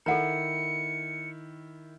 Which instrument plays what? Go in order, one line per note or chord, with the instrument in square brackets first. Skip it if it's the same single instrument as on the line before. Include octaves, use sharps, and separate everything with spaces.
[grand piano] D#3 E4 [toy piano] A4 F#5 A#5 [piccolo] C#7